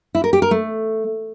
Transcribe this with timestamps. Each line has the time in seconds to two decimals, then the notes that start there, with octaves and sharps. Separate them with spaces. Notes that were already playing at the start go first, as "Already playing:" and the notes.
0.15 E4
0.24 A#4
0.33 G4
0.42 A#4
0.51 A3